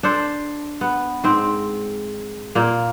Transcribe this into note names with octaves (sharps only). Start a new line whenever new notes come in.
D4 A4 C5
B3
G#2 C4
A#2 A#3